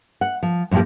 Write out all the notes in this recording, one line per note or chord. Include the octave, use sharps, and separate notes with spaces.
F#5
F3
F#2 A2 F3 A#3 G4